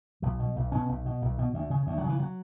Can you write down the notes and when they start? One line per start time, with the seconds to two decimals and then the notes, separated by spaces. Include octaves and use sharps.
0.22 B1 F#3
0.39 B2
0.56 B1
0.72 B2 C#4
0.89 B1
1.06 B2
1.22 B1
1.38 B2
1.54 D2
1.70 C#3
1.87 D2
1.98 F#3
2.04 C#3
2.09 E3
2.19 F#3